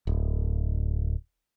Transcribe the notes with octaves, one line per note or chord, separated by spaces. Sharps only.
D1